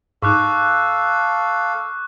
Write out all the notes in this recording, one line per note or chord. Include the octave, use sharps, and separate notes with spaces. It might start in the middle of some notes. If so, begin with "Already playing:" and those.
G#2 D#4 A4 F5 C#6 D6 F#6